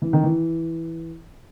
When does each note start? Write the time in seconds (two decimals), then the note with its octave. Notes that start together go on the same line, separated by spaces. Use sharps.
0.02 E3
0.13 D#3
0.23 E3